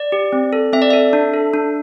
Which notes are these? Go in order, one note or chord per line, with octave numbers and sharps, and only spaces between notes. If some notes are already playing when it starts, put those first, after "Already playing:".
Already playing: D5
G4
C4
A4
C4 E5
D5
A4 E5
D4
A4
D4